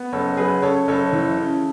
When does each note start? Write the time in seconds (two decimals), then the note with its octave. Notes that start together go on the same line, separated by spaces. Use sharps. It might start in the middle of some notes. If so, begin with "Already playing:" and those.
Already playing: B3
0.13 F#1 A4 C#5
0.37 F#3 G#4 B4
0.62 C#3 A4 C#5
0.88 F#1 A4 C#5
1.13 E3
1.38 C#3